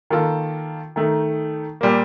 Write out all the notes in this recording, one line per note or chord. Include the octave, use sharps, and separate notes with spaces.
D#3 A#3 F4 A4
D#3 A3 D#4
A#2 G3 A#3